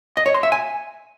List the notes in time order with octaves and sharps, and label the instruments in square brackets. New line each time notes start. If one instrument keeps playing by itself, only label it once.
[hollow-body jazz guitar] D#5
C#5
C6
E5
G#5